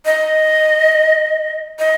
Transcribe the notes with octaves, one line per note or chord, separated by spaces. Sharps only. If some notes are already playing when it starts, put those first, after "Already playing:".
D#5
D#5